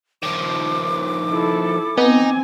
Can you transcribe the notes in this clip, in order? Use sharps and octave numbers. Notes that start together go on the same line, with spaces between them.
D#3 F3 D6
E4 A4
B3 C4 D#4 G#5